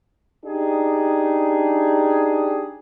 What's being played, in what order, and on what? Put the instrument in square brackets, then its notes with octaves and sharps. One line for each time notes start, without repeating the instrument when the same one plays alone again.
[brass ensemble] D4 D#4 G4 G#4